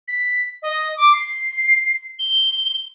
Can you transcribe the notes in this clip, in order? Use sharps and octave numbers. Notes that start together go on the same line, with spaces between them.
B6
D#5
D6
C7
G7